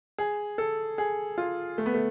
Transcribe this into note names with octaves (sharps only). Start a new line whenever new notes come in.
G#4
A4
G#4
F4
A3
B3
A3